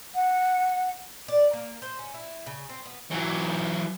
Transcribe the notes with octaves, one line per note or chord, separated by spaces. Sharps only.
F#5
D5
A#3
C5
C#4
E4
C#3
C4
B3
E3 F#3